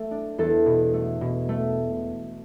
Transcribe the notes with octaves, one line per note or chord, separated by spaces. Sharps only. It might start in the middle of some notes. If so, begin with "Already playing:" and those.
Already playing: A3
D4
E2 A4
B2
A3
B2
A3